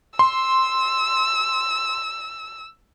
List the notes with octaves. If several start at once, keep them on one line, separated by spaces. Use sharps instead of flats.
C6 E6